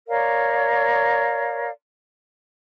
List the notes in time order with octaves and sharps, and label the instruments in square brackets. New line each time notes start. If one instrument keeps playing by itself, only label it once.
[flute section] A#4 C#5 D5 F5